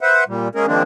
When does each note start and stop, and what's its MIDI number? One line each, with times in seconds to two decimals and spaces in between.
0.01 0.24 71
0.01 0.24 72
0.01 0.24 76
0.01 0.24 78
0.28 0.48 46
0.28 0.48 55
0.55 0.66 56
0.55 0.66 58
0.55 0.66 61
0.55 0.66 68
0.55 0.66 70
0.67 0.83 51
0.67 0.83 53
0.67 0.83 56
0.67 0.83 58
0.67 0.83 60
0.67 0.83 62